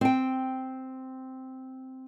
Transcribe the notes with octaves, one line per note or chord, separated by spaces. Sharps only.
C4 G5